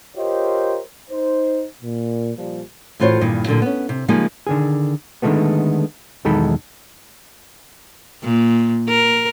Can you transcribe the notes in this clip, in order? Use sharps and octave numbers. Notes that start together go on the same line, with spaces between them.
F4 G4 A#4 C5 C#5 D#5
D#4 C5
A#2
A#2 F3 G3
A2 E3 F4 F#4 C5 C#5
E2 G2 A#2 D#3
A#2 D3 F3 F#3
B3 C#4
C3
C#3 F3 G3 G#3 A#3 D#4
D3 D#3 G#4
D3 D#3 F3 G#3 A3 B3
B1 E2 D#3 G#3 A4 B5
A#2
A#4